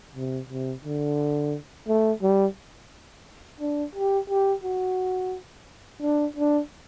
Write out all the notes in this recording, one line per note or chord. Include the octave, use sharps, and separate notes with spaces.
C3
C3
D3
A3
G3
D4
G4
G4
F#4
D4
D4